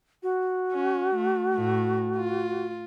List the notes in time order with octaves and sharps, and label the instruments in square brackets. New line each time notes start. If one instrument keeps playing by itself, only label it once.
[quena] F#4
[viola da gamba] C#4
A3
A2 A3
F4